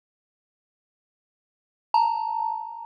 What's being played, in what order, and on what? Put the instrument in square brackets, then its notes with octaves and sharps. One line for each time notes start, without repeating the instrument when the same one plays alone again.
[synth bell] A5 A#5